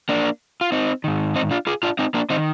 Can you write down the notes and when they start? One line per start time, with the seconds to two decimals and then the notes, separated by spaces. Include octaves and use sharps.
0.09 A#3 D4
0.61 F4
0.72 C4 D#4
1.04 G#2 D#3
1.36 C4 D#4
1.51 D4 F4
1.67 F4 G#4
1.83 D4 F4
1.99 C4 D#4
2.14 A#3 D4
2.30 D#3 C4 D#4